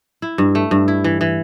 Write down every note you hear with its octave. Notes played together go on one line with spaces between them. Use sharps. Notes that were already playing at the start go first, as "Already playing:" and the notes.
E4
G2
A3
G2
E4
E3
E3